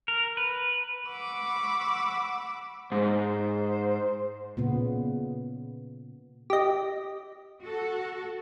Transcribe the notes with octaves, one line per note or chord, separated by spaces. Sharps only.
A#4
B4
F#5 B5 C#6 D6 E6
G#2 C5
A#2 C#3 B3
G4 D#5
F#4 A4